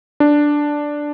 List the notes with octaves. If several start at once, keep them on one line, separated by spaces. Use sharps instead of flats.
D4